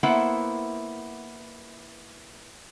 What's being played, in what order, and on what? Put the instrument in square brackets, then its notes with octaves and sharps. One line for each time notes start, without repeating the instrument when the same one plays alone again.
[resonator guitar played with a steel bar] A#3 B3 E4 C5 E5 F#5